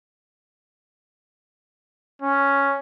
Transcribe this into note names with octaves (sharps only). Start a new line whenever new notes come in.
C#4